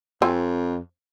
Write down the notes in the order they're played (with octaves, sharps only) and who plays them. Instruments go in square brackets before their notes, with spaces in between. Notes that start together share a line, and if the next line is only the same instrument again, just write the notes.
[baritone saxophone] F2 [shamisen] C4 G#5